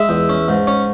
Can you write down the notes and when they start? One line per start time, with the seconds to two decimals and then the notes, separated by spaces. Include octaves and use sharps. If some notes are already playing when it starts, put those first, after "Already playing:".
Already playing: G#3 E5
0.09 E2
0.29 C#4
0.48 G#2
0.67 C#4 C#5